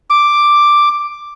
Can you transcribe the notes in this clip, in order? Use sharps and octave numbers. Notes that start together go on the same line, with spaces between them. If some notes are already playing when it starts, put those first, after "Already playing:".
D6